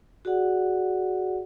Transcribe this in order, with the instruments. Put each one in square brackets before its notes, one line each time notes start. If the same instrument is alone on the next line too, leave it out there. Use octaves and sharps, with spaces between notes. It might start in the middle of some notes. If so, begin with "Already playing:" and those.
[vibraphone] F#4 G#4 D5 F#5